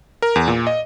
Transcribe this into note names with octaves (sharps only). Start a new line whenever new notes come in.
A#4
E2
A#2
D#5